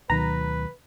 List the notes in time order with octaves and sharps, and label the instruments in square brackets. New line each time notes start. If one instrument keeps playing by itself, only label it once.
[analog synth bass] D2 [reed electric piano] B2 D#3 F#3 [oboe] B4 [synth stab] A#5